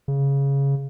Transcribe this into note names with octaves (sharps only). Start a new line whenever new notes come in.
C#3